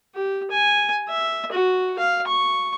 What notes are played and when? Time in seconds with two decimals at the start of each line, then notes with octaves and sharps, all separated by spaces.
0.15 G4
0.51 G#5
1.09 E5
1.52 F#4
1.99 F5
2.27 C#6